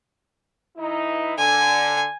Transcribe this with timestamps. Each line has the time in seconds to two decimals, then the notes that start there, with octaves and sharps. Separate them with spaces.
0.77 E3 D#4 E4
1.38 D3 G#5